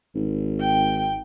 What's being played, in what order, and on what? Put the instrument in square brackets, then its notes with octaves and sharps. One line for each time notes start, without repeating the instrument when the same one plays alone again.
[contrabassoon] G#1
[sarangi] G5